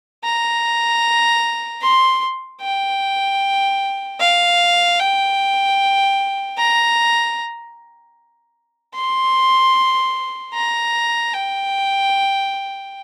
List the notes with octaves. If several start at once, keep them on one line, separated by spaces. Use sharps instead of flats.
A#5
C6
G5
F5
G5
A#5
C6
A#5
G5